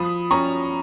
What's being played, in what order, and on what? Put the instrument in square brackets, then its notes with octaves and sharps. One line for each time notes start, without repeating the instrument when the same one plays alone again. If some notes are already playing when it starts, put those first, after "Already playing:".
Already playing: [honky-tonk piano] F3 B5 D#6
C#4 A#5 C#6